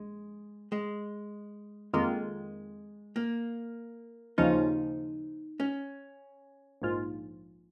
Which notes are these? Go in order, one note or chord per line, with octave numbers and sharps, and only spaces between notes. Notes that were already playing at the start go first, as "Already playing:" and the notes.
Already playing: A#1 G#3
G#3
F2 D#3 G#3 A#3 F4
A#3
D#2 C#3 F3 C#4 D#4 F4
C#4
A#1 G#2 G#3 F4